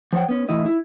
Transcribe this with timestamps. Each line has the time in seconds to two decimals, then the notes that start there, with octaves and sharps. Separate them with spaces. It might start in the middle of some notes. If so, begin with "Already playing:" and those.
0.13 F3 C5 C#5 F#5 G5
0.29 B3 C#4
0.49 A2 E3 E4 D#5
0.66 E4